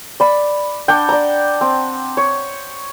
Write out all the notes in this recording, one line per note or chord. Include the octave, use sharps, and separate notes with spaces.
D5 B5
D4 F#5 G5
D5 A#5
C4
C#5